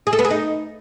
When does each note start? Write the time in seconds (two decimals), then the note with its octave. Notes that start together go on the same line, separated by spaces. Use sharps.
0.07 G#4
0.13 A4
0.19 B3
0.25 G#4
0.31 D#4